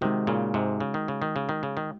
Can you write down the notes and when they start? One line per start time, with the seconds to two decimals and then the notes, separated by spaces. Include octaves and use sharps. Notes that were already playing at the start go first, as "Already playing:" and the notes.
0.01 C3 D#3 G#3 D#4 F#4
0.27 A#2 C#3
0.54 G#2 C3
0.80 C#3
0.94 D#3
1.08 C#3
1.22 D#3
1.36 C#3
1.49 D#3
1.63 C#3
1.77 D#3